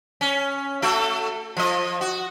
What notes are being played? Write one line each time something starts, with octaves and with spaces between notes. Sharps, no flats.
C#4
A3 F#4 A4
F3 D#5
F#4